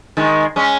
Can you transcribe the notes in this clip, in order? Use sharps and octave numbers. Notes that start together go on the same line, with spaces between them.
D#3 G#3
G#3 C#4